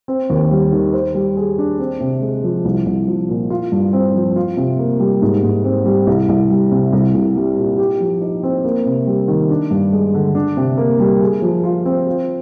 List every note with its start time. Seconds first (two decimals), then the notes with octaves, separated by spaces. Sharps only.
0.08 C4
0.30 D#2
0.51 G3
0.73 D#3
0.93 C5
1.15 G3
1.37 G#4
1.58 D4
1.80 C4
2.00 C3
2.21 G#3
2.44 F3
2.65 C2
2.86 C2
3.08 F3
3.29 A#2
3.50 F4
3.72 G2
3.93 C4
4.14 F3
4.36 F4
4.57 C3
4.79 A#3
5.00 G3
5.22 G#2
5.43 G#2
5.64 C4
5.86 G3
6.07 C2
6.29 C2
6.51 G3
6.72 C3
6.93 C2
7.14 C2
7.36 G3
7.57 A#2
7.78 G4
8.00 F3
8.21 D#4
8.43 C4
8.65 A#3
8.86 C3
9.07 G3
9.28 D#3
9.50 D4
9.71 G2
9.92 G#3
10.15 D3
10.35 D4
10.57 C3
10.78 A#3
11.00 G3
11.21 G#4
11.42 F3
11.64 F4
11.85 C4
12.07 F4